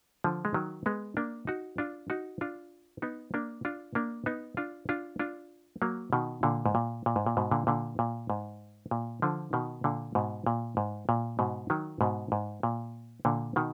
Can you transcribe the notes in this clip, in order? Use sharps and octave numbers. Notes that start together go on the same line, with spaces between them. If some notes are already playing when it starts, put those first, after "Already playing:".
D3 F3
G#3
D#3 F#3
G#3 B3
A#3 D4
D#4 F#4
D4 F4
D#4 F#4
D4 F4
B3 D#4
A#3 D4
D4 F4
A#3 D4
B3 D#4
D4 F4
D4 F4
D4 F4
F#3 A#3
B2 D#3
A#2 D3
G#2
A#2
A#2
G#2
A#2
G#2 B2
A#2 D3
A#2 D3
A#2
G#2
A#2
D3 F3
B2 D#3
A#2 D3
G#2 B2
A#2
G#2
A#2
G#2 B2
D#3 F#3
G#2 B2
G#2
A#2
A#2 D3
B2 D#3